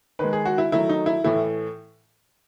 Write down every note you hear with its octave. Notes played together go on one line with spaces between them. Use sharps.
D#3 G#3 B4
G#4
F#4
E4
D#3 F#3 A3 E4
D#4
E4
A2 E3 A3 E4